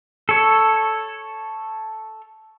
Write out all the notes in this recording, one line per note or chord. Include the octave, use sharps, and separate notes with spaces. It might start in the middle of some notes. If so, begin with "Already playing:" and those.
A4 C#5